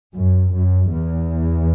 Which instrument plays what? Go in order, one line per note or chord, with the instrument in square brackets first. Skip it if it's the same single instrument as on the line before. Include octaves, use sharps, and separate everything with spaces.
[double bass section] F#2
F#2
E2